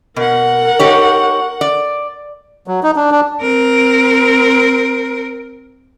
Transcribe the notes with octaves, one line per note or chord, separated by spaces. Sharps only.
B2 A#4 F#5
D#4 G4 C#5
D5
F#3
D#4
D4
D4
C4 A#4